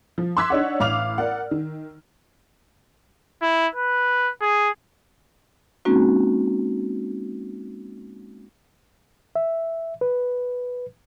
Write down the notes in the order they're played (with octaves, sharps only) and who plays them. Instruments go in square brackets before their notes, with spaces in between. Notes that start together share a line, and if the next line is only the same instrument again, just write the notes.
[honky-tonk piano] F3
C6 D6 E6 F#6 G#6 B6
D4 D#4 C#5 F#5
A1 F5 D6 F6 F7
A#4 D5 F#5
D#3
[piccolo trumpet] E4
B4
G#4
[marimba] G#3 A#3 C4 C#4 D#4 F#4
[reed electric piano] E5
B4